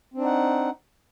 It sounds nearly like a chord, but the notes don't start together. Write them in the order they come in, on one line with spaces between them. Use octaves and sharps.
C4 D4 D#4 F#5